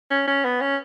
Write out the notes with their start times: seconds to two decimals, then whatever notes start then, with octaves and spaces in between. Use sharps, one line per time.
0.11 C#4
0.28 C#4
0.44 B3
0.61 C#4